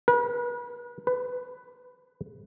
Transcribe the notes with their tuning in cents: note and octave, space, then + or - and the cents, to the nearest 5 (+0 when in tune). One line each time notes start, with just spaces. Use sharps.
B4 -35
B4 +15